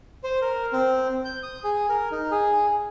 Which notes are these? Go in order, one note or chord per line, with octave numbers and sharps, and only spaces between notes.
C5
A#4
C4
G6
D#6
G#4
A#4
D#4
G#4